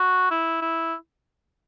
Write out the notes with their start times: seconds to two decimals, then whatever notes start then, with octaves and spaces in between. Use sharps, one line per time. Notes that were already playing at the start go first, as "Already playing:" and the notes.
Already playing: F#4
0.31 E4
0.62 E4